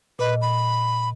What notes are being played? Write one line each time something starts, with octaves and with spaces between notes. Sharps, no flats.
A#2 B4 D#5
B5